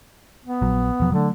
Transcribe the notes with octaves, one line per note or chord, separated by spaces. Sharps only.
B3
A#1 F#3
E1 F3 F#3
D3 F#3 A3